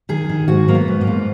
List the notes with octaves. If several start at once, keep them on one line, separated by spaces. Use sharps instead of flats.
D#3 G#4
D#3
G#2 F#4
G#2 A#3
B3
G#2
A#3
G#2